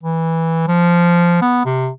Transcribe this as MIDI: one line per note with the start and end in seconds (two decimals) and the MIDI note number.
0.03 0.66 52
0.68 1.40 53
1.42 1.65 59
1.65 1.89 48